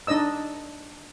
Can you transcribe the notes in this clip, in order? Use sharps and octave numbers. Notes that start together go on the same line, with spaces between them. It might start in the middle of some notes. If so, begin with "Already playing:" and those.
D4 D#4 D5 D#5 E6